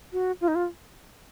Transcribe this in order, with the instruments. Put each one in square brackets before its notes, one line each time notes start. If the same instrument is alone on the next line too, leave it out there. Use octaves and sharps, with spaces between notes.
[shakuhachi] F#4
F4
D#4
F4